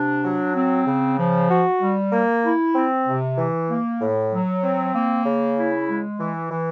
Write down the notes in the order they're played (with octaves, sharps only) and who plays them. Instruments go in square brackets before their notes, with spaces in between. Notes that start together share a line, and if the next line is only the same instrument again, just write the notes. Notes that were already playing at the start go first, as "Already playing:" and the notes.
Already playing: [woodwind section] C3 D4
F#3
C4
C#3
F3
F#4
G3
A#3
E4
C4
C3
E3
A#3
A2
F#3
C4
A#3
C#3
E4
G#3
E3
E3